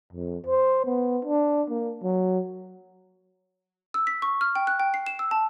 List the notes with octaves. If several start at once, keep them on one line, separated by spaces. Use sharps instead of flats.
F2
C5
B3
D4
A#3
F#3
E6
B6
C#6
F6
G5
F#6
G5
C7
E7
E6
A5